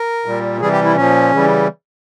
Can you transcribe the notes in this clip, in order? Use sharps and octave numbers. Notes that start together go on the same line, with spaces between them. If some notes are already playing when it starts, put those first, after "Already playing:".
Already playing: A#4
A#2 G3
C3 E3 G3 G#4
G4
E4
A#2 F3 C#4
C#3 E3 G3